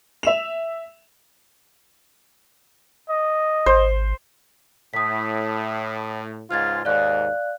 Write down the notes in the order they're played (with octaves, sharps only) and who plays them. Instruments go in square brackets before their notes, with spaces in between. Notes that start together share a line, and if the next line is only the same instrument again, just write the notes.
[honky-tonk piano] E5 E7 F7
[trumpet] D#5
[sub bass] G#1 [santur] C5
[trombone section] A2 [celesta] D#6 B6
[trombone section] C#2 G#2 F4 [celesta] F6 G#6 A6
[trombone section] D#2 G#2 [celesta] D5 F5 F#6